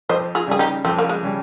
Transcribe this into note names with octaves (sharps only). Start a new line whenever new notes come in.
F2 C5 D#5
F4 G#4
C#3 G3 C#4 G#4
D#4 G4
F2 C4
A#3
G#3
C#3 G3 C#4